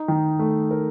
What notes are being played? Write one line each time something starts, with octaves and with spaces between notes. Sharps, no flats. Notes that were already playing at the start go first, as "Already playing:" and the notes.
Already playing: D#4
D#3
A3
A#4